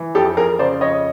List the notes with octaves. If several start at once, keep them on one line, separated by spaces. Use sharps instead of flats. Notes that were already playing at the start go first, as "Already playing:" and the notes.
Already playing: E3
F2 G4 A4
F2 G#4 A#4
C#3 C5 D5
F2 C#5 D#5